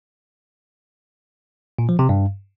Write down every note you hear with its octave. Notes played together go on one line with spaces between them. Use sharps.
A#2
F3
C3
G2